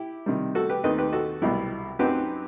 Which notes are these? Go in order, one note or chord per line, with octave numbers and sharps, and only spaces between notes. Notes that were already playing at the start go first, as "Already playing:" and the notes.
Already playing: E4 G4
C3 D#3 G3
F#4 A4
G4 B4
D#2 D#3 A3 C4 D#4 B4 D#5
G4 B4
F#4 A4
C2 B2 F#3 E4 G4
F#2 F#3 C4 D#4 G4 B4